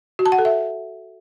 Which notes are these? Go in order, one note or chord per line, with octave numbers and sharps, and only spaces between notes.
F#4
A5
F#5
A4
E5